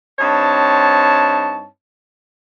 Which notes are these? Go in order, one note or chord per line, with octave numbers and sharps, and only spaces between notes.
G2 C4 D#4 C#5 A5